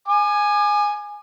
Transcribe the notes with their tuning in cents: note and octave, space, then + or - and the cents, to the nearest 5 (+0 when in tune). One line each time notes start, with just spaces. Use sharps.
G#5 +0 D6 +40